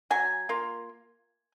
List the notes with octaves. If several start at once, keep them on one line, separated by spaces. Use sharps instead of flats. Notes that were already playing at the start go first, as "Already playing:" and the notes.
F#3 G#5
A#3 F4